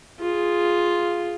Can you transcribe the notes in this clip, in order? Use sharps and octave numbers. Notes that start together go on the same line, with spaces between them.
F4 G#4